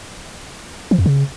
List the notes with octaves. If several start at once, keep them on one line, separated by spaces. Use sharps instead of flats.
F3
F2
C#3